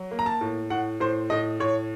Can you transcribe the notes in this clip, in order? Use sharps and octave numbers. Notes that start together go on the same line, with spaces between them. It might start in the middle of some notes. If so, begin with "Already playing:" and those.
Already playing: F#3
A#3
A#5
A5
A2
A2 F#5
A2 C5
A2 D#5
A2 C#5